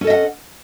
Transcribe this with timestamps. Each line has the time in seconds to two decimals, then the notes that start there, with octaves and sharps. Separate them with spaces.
0.01 C#4
0.04 A4
0.07 D#5
0.10 E5
0.13 F#5